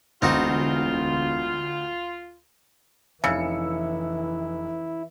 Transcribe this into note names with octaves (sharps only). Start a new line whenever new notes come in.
E1 D2 C4 D#4 F4 F#4
F1 C#3 E3 E4 E6 C#7